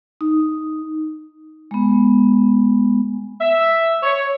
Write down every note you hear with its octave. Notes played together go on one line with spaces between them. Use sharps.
D#4
G#3 B3
E5
C#5